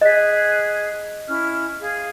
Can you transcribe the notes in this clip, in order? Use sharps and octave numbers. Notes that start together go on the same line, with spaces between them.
G#4 D#5 F#6 B6
C#4 E4 F6
G#4 F5